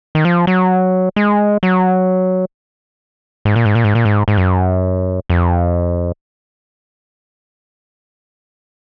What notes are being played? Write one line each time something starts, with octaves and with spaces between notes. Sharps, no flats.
D#3
F3
F#3
G#3
F#3
G#2
A#2
G#2
A#2
G#2
A#2
G#2
G#2
F#2
F2